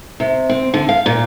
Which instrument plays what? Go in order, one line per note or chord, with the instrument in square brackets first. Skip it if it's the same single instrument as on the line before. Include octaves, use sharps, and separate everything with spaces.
[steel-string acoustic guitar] C3
C4
D3
F5
A#2